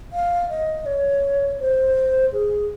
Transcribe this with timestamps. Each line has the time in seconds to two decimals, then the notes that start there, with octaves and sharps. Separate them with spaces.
0.12 F5
0.49 D#5
0.86 C#5
1.60 C5
2.33 G#4